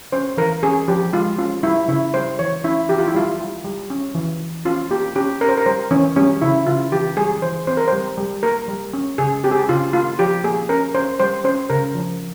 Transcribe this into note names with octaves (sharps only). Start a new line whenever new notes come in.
C#4 C5
E3 A#4
C#4 G#4
F3 G4
G#3 F4
C#4 F4
G3 E4
C#3 E4
G3 C5
E3 C#5
C#4 E4
E3 G4
F4
E4
G3 F4
G3
G3
C#4
E3
E3
C#4 F4
A#3 G4
C#4 G4
C#4 A#4
C5
A#4
G3 C5
E3 C#4
G3 C#4
C#3 E4
C#3 F4
E3 G4
G3 G#4
E3 C5
C4 C5
A#4
C5
G3
G3
A#3 A#4
G3
C#4
C#3 G#4
C4 G4
G#4
G4
C#3 F4
A#3 F4
F3 G4
A#3 G#4
C#4 A#4
C#4 C5
G3 C5
C#4 C5
C#3 A#4
F3